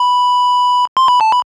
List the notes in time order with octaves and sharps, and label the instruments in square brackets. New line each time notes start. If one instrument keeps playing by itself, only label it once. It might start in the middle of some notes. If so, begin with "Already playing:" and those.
Already playing: [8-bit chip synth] B5
C6
B5
A5
B5